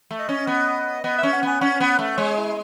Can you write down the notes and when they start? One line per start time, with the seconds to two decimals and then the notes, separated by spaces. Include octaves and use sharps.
0.11 A3
0.19 D#5
0.29 C#4
0.47 B3
1.04 B3 D#5
1.18 E5
1.23 C#4
1.33 F#5
1.43 B3 G#5
1.61 C#4 F#5
1.80 B3
1.99 A3
2.18 G#3 C#5
2.37 E4